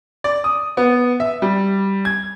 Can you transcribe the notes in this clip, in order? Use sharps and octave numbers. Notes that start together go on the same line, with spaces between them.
D5
D#6
B3
E5
G3
G#6